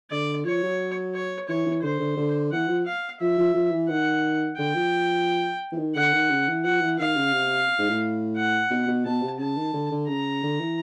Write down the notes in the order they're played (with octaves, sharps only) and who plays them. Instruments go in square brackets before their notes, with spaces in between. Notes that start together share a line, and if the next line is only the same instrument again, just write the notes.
[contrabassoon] D3 [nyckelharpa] D5
[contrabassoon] F3 [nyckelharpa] C#5
[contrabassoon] F#3
[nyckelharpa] C#5
[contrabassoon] E3 [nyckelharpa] C#5
[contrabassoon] E3
[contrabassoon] D3 [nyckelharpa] C5
[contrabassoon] D3
D3
[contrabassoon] E3 [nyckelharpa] F#5
[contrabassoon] F3
[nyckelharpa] F5
[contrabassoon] F3 [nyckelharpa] E5
[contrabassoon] F3
F3
E3
[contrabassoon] D#3 [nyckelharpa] F#5
[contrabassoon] D3 [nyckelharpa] G5
[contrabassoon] F3
E3
D#3
[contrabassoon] D3 [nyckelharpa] F#5
[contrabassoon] D#3
C#3
E3
[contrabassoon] F3 [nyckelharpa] F#5
[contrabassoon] E3
[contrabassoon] D#3 [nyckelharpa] F5
[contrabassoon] C#3
C3
G#2
A2
[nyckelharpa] F#5
[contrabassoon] B2
B2
[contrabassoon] B2 [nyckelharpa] A5
[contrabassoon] C3
[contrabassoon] C#3 [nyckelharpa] A5
[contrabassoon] D#3
D3
D3
[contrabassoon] C#3 [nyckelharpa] A#5
[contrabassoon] D3
E3